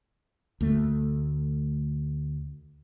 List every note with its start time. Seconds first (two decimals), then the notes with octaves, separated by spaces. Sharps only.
0.61 D2 A3